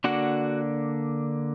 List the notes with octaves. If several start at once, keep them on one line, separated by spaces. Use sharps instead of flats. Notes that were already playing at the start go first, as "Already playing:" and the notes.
D3 A#3 D4 F#4 F#5